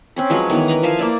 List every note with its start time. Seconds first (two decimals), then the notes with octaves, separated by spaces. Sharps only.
0.16 C4 C#4 B5
0.30 F3 F#3 G#3 B4
0.50 D#3 E3 B3
0.68 A#4 B4 A#5
0.83 F3 E5 F5 G#5
0.99 A#3 E4 D5